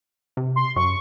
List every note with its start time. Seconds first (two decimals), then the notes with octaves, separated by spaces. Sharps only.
0.37 C3
0.56 C6
0.76 F#2 C#6